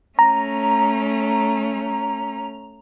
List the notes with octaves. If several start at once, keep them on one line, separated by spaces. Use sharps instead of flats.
A3 C#4 A#5